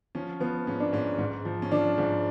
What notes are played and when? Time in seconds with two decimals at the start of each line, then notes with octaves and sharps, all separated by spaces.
0.15 F3 C#4
0.40 F3 B3
0.67 G#2 C#4
0.80 D4
0.93 G#2 C#4
1.19 G#2
1.45 F3
1.62 C#4
1.71 F3 D4
1.98 G#2